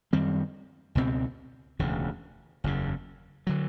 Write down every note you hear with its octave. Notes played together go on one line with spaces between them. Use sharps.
F#2 D#3 G3 C4
C#2 B2 G#3 C4
E1 D2 C#3
F#1 E2 C#3
D3 F#3